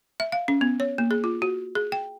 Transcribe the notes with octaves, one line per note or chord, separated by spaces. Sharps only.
E5
F5
C#4
B3
C#5
A#3
G#4
F4
F#4
G#4
G5